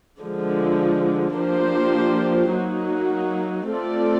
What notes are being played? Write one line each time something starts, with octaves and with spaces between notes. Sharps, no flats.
D3 F3 G#3
F3 A#3 D4 G4 C5
F#3 A#3 D#4 F#4
A3 C4 F4 A4 D5